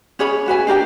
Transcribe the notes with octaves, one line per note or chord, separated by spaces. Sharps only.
C#4 G#4 C#5 B5
C#4 F#4 B4 G#5
D4 G4 A#4 G5